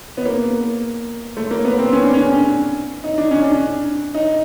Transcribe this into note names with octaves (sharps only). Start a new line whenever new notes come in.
B3
A#3
A3
A#3
B3
C4
C#4
D4
C#4
D#4
D4
C#4
D4
D#4